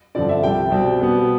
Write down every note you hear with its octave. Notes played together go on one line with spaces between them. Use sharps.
G2 D3 F3 C4 D5
E5
C2 C3 G3 G5
B2 G3 C4
B2 G3 B3